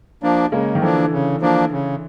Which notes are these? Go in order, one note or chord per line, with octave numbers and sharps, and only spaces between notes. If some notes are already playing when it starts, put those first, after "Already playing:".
F3 A#3 D4
C#3 G#3 A#3
D#3
D3 E3 F3 A#3 D4
C#3
F3 A#3 D4
C#3